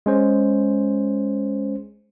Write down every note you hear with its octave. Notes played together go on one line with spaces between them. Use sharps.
G#3 C#4 C5